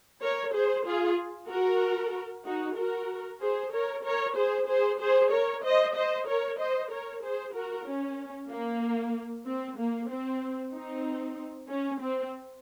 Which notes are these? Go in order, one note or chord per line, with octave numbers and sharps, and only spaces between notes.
A#4 C#5
G#4 C5
F4 G#4
F#4 A#4
D#4 F#4
F#4 A#4
G#4 C5
A#4 C#5
A#4 C#5
G#4 C5
G#4 C5
G#4 C5
A#4 C#5
C5 D#5
C5 D#5
A#4 C#5
C5 D#5
A#4 C#5
G#4 C5
F#4 A#4
C#4
A#3
C4
A#3
C4
C4 D#4
C#4
C4